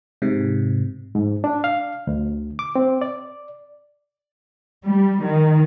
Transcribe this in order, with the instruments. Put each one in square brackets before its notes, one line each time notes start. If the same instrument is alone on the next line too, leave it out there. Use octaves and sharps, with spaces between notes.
[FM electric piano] G#2 C3
[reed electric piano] G#2
D4
F5
D2
D6
C4
D5
[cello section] G3
D#3